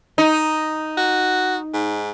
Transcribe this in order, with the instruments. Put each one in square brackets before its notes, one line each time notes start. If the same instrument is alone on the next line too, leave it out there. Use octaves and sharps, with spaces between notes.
[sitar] D#4
[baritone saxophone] F#4
G#2